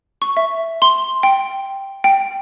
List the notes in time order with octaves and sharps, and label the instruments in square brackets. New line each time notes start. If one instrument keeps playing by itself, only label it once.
[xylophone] C#6
E5
C6
G5
G5